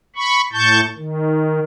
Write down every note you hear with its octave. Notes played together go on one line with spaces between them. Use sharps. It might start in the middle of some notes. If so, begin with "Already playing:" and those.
B5 C#6
A2 A5 C#6 G6
D#3